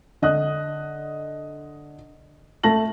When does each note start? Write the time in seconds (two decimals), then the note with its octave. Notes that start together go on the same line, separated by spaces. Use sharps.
0.22 D3 D#5 D#6 F#6
2.63 A3 A5 A#6 F#7